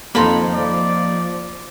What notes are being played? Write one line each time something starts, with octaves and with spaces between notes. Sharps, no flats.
F2 F3 A#3 D#4 A4 F5 B5 C6
F3 D5